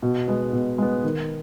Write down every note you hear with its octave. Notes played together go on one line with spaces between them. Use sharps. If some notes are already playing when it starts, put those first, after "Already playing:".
B2
G#3 B3
B2
G#3 B3
D#3